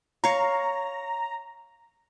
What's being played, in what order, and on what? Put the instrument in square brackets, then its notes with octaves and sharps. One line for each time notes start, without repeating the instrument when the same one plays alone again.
[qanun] C#5 F5 [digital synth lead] A#5